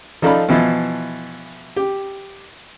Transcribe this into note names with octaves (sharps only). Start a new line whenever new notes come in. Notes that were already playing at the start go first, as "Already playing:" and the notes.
F3 D#4 A4 D5 F5 B5
B2 E3 F3 E4
G4